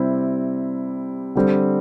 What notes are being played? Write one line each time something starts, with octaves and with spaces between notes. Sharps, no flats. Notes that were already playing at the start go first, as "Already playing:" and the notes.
Already playing: C3 G3 C4 E4
D3 G3 C4